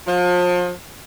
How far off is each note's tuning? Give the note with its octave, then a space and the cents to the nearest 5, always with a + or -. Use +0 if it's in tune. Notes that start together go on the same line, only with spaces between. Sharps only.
F3 +35